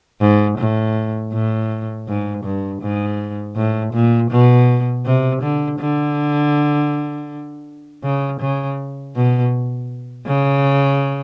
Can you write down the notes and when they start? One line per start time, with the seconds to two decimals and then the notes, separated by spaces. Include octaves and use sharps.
0.21 G#2
0.58 A2
1.33 A2
2.08 G#2
2.45 G2
2.82 G#2
3.56 A2
3.94 A#2
4.31 B2
5.06 C3
5.42 D3
5.80 D3
8.03 C#3
8.41 C#3
9.16 B2
10.27 C#3